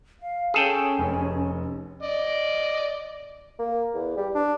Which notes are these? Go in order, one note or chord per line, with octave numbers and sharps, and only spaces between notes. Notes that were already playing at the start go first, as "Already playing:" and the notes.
F5
C#4 G#4 A4 G5
F1
D5 D#5
A#3
E2
G3
D4